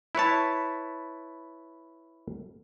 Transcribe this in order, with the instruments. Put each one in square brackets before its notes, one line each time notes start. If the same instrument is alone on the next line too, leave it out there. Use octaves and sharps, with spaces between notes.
[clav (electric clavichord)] E4 B4 C#5 A5